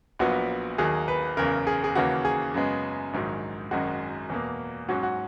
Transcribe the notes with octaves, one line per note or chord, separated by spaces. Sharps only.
A#1 A#2 F#3 B3 F#4
D#2 D#3 F#3 G#4
B4
F#1 E2 C#3 A#4
G#4
G#4
D#2 C#3 E3 A#3 C#4 F#4
G#4
F#2 C#3 G#3 B3
A#1 G#2 D#3 F#3
G#1 F#2 D#3 G#3 F#4
E2 B2 A#3
G#2 F#3 C#4 F#4
F#4